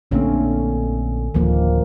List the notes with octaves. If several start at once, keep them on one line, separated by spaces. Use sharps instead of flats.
A#1 D3 A3 A#3 C4 C#4
D1 D#3 F3 A#3